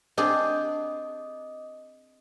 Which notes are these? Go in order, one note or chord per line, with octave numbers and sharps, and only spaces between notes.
C4 D4 G#4 D#5 D6 D#6